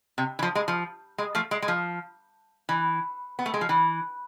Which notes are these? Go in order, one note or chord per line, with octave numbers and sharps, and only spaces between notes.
C3
E3
F3
G#3
F3
G#3
F3 A3
G#3
G#3
F3
E3
B3
A3
G#3
F3
E3